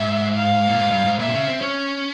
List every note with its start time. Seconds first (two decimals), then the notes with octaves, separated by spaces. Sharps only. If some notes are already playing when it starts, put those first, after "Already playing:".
Already playing: G#2 E5
0.36 F5
0.67 A#2
0.79 G#2
0.91 G2
1.05 G#2
1.19 A#2 E5
1.27 C3
1.34 C#3
1.47 C4
1.61 C#4 C#5